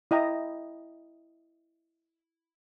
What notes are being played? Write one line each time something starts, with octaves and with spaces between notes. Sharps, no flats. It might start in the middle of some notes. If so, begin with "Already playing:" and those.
E4 D#5 G5 A#5